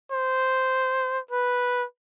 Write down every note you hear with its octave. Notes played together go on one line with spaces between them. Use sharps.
C5
B4